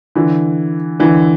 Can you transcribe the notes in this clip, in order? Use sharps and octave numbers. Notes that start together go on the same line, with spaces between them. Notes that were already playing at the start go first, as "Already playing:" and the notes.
D3 E3
D3 E3